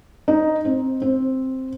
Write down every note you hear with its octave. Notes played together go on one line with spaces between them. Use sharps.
D#4
C4
C4